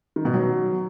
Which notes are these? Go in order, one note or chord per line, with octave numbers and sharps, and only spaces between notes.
D#3
B2
F#3